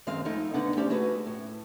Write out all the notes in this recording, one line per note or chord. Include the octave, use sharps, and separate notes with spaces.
F#2 D#3 G#3 C4 F5
F2 A3 D#4
D2 D3 B3 D4 D#4 F#5
A3 C#4 G4 C5 D5
A3 F#4 G#4 B4
A2